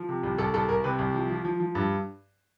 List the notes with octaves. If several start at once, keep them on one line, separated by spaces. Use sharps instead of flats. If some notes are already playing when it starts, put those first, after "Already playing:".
Already playing: F3
C3
C2
C2 A4
C2 A4
C2 A#4
C3 B4
C2
F3
F3
F3
F3
G2